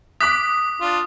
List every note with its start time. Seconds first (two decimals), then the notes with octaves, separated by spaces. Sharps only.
0.21 D6 D#6 F#6 B6
0.81 D4 F4